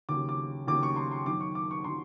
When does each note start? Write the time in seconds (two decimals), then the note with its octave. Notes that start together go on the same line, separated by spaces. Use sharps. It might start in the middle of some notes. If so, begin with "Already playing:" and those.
0.09 D#2 C#3 F#3 D6
0.29 D6
0.67 D#2 C#3 F#3 D6
0.83 C#6
0.96 C6
1.11 C6
1.26 F#2 D#3 F#3 D6
1.41 C#6
1.55 D6
1.71 C#6
1.84 D#3 F#3 C6